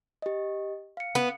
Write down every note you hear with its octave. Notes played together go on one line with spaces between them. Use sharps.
G4 D#5
F5 C#7
B3